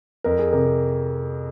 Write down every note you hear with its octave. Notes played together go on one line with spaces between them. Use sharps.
F2 A#4
G#4
C3 A#4